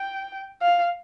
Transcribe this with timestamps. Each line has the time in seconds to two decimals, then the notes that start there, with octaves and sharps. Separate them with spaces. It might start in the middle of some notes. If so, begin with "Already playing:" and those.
Already playing: G5
0.62 F5